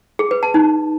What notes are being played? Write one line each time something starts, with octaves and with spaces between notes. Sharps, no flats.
G#4
B4
A5
D#4